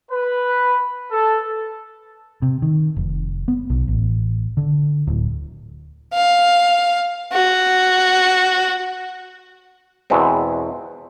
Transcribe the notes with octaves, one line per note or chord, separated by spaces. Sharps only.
B4
A4
C3
D#3
F1
B3
B1
A1
D3
D1
F5
F#4
E2 B2 G#3 B3 C4